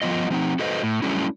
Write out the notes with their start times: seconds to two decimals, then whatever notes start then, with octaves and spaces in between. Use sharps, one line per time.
0.02 F3 B3 F4 D#5
0.30 F3 C4 D#4
0.59 F#4 A4 B4 C5 D#5
0.83 A2
1.02 F#3 G3 A3 C#4 D4 E4